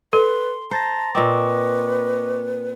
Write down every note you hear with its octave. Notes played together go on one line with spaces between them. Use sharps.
A4 B4 C6
C5 A5 A#5 A6 A#6
A#2 C4 B4 D#5 C#6 D6